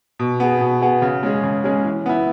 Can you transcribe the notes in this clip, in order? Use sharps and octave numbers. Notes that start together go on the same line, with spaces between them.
B2
B3 G#4
B2
B3 G#4
C#3
G#3 C#4 G#4
C#3
G#3 C#4 G#4
E3
B3 E4